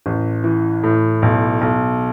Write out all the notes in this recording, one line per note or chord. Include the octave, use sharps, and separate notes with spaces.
A1
E3
A2
B1
B1